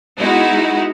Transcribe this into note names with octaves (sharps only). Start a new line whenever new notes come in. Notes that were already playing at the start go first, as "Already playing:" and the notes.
G#3 B3 D#4 E4 F#4